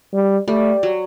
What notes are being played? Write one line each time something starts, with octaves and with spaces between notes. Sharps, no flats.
G3
G3 A3
F#3